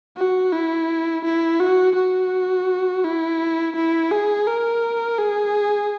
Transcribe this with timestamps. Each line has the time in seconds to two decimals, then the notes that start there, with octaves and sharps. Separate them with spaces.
0.17 F#4
0.53 E4
1.25 E4
1.60 F#4
1.95 F#4
3.04 E4
3.75 E4
4.11 G#4
4.47 A#4
5.18 G#4